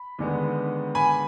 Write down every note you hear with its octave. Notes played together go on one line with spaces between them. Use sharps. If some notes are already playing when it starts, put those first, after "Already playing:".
Already playing: B5
D#2 D3 G#3 B3
G#5 B5